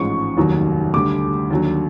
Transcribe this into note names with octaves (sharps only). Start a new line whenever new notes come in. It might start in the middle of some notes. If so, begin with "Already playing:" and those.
Already playing: A1 G#2 F3 G#3 C#4 C#6
F1 D#2 D#3 F#3
D2 D3 G3 D6
D#2 D3 F#3